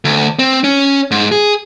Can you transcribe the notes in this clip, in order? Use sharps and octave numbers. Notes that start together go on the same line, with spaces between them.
D2
C4
C#4
G#2
G#4